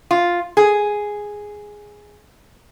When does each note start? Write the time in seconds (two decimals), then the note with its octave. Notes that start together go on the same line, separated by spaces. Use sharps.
0.11 F4
0.57 G#4